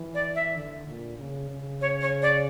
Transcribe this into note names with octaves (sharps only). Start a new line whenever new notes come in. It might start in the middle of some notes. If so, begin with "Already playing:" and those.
Already playing: E3
D5
E5
D3
A#2
C#3
C#3
C#5
C#5
D5